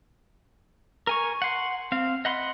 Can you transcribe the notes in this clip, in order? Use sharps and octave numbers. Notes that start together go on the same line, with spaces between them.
A#4 G#5 C#6
F#5 C6
C4 F5
D#5 F#5 B5 C6